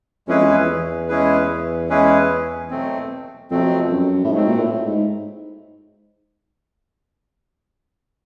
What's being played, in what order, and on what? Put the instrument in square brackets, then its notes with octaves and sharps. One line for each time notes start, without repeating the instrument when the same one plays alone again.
[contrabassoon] F2 [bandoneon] G#3 C#4 E4 G#4 B4
[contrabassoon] E2
E2
[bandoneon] G#3 C#4 E4 G#4 B4
G#3 C#4 E4 G#4 B4
B2 F#3 A3 C4
[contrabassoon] F2 [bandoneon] B2 F#3 A3 C4
[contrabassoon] F#2
A2
[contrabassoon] G#2 [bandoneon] B2 F#3 A3 C4
[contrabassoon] A#2
A2
G#2